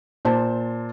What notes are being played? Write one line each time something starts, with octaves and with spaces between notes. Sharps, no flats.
A#2 C5 A5